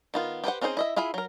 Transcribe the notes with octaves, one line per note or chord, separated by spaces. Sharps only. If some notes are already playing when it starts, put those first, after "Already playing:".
D#3 B3 F4
G4 B4 C5 F#5
C4 C#4 D#4 G#4 C5
E4 D#5 E5
E4 F4 G#4 E5 B5
F#3 A#4